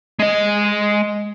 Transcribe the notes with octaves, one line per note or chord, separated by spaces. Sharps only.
G#3 D#5